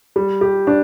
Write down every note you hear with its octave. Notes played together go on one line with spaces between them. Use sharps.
G3
G4
D4